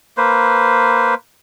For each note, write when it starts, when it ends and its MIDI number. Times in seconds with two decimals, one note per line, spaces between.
0.17 1.14 58
0.17 1.14 71
0.17 1.14 72